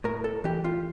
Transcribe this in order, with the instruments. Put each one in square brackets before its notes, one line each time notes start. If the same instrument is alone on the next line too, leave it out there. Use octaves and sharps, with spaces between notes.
[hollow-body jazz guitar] A2 A#4
A4
E3 G4
F4